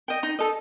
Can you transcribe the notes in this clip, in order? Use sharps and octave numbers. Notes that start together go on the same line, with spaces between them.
D#5 G5
D#4
A4 D#5